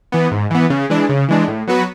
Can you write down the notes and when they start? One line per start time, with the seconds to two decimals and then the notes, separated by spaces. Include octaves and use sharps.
0.12 E3 B3
0.31 G#2
0.51 E3 B3
0.70 C#3
0.90 E3 G#3 D4
1.09 C#3
1.28 E3 G#3 D4
1.48 A2
1.67 F#3 B3 F#4 B4